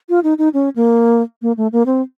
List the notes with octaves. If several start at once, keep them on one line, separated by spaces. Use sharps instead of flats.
F4
D#4
D#4
C#4
A#3
A#3
A3
A#3
C4